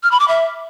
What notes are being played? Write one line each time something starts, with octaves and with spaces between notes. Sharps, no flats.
F6
B5
D6
E5